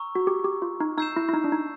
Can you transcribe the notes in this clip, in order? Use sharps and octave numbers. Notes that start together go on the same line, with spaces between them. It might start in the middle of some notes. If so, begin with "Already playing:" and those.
Already playing: A#5 C#6 E6
F#4
G4
G4
F4
D#4
D#4 E6 G6 C7 E7
E4
E4
D#4
D4
D#4